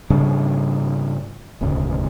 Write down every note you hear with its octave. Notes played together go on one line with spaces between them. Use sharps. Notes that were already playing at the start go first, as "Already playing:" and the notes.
G#2 C#3 G3 D4
E1 D2 G#2 C#3